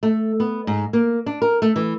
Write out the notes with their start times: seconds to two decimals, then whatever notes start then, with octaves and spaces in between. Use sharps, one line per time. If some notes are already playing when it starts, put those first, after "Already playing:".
0.03 A3
0.40 B3
0.67 G#2
0.93 A#3
1.26 D4
1.42 A#4
1.62 A3
1.76 E3